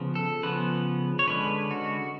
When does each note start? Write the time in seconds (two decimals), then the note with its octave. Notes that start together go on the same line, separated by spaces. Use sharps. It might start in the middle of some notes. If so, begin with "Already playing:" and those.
Already playing: C#3 F3 B3
0.15 A4
0.43 C#3 F3 B3 B4
1.19 C#5
1.27 D3 G#3 C#4 B4
1.71 F#4